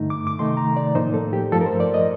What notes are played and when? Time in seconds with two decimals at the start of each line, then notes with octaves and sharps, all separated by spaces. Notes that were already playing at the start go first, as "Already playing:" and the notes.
Already playing: G2 D3 A3 D#4
0.10 D6
0.27 D6
0.38 C3 D#3 A3 D#4 C6
0.57 A#5
0.76 D5
0.95 A2 F3 A#3 D#4 C5
1.14 A4
1.33 G4
1.52 G2 F3 A3 A4
1.61 A#4
1.66 C5
1.80 D5
1.94 D#5